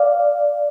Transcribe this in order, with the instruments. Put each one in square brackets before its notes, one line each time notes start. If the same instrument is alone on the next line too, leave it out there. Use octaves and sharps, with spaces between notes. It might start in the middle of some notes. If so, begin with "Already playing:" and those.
Already playing: [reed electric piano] D5 F5